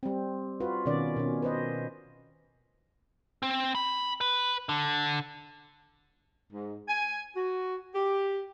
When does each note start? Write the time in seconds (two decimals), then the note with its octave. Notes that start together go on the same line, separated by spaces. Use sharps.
0.03 G3 C4
0.60 F4 F#4 B4
0.86 B2 D#3 C#4 D5
1.16 B2 C#4
1.42 B4 C5 D#5
3.43 C4
3.75 B5
4.21 B4
4.69 D3
6.53 G#2
6.89 G#5
7.36 F#4
7.95 G4